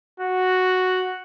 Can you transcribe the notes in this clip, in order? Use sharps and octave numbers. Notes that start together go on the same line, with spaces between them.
F#4